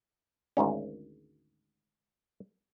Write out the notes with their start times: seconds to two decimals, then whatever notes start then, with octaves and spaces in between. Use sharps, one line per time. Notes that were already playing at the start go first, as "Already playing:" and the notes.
0.57 G#1 D2 G#2 C#4